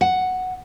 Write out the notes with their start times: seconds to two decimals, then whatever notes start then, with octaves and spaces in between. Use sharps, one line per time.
0.01 F#5